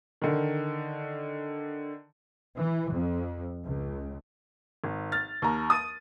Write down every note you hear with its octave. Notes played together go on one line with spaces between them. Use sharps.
D3 D#3
E3
F2
C#2
G#1
F6 A6
D#2 A#5
D#6 A6 D#7